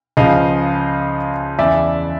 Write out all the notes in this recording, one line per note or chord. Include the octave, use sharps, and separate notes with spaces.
C#2 C#3 F3 D#5 F5
E2 C#3 E3 D5 E5